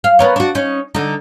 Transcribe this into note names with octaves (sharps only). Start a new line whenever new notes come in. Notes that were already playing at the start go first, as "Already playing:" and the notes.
F5
B3 A#4 C#5
D4 F#4
C#4 D#4
D3 D#4